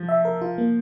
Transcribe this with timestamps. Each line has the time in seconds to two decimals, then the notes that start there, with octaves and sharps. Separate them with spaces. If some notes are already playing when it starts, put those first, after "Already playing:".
Already playing: F3
0.09 E5
0.25 A#4
0.41 F4
0.58 A#3